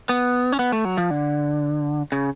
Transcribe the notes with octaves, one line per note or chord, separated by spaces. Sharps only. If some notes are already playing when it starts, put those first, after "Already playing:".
B3
C#4
B3
A3
F#3
F3
D3
C#3